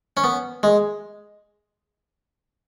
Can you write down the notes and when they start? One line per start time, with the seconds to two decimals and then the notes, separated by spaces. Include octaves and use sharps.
0.17 C#4
0.24 B3
0.63 G#3